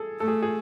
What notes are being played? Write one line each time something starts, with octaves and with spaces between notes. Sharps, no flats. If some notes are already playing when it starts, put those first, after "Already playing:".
Already playing: G#4 A4
A3 A4
G#4
G#4